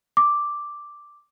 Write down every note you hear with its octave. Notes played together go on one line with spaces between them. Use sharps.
D6